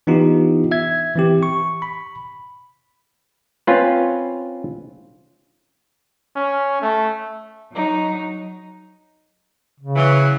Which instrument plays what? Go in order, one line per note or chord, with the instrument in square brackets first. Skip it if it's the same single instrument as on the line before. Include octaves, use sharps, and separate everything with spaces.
[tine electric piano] E3 B3 D4 D#4 F4 G4
E5 G#6
E3 C4 G4
C#6
B5
[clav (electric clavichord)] C4 C#4 F4 B4
[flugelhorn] C#4
A3
[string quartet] F#3 D#4
[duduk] C#3
[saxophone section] E3 F#3